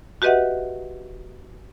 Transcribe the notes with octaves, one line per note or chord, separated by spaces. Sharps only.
F#4 G4 B4 D#5 E5 F#5